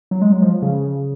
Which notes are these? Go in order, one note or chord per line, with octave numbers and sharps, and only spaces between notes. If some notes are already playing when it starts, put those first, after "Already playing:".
F#3
G#3
F#3
F3
C#3